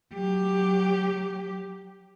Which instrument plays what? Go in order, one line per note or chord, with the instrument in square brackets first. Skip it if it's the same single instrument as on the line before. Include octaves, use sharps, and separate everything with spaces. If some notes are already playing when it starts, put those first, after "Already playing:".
[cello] F#3 G4